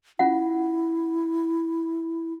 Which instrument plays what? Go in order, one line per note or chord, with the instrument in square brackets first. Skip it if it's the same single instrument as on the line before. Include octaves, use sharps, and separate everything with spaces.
[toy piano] C#4 F4 F#5 [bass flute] E4